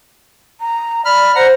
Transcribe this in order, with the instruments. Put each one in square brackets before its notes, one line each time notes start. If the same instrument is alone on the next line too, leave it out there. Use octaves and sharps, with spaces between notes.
[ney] A#5
[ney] D5 [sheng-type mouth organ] B5 F6
[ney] C5 [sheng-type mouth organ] F#5 A#5